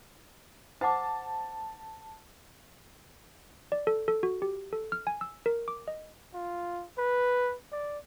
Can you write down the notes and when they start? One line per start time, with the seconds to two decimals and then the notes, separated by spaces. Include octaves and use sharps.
0.81 C5 F#5 A5 D6
3.72 D5
3.87 A4
4.08 A4
4.23 F#4
4.42 G4
4.73 A4
4.92 F6
5.07 G#5
5.21 E6
5.46 A#4
5.68 D6
5.88 D#5
6.34 F4
6.98 B4
7.72 D5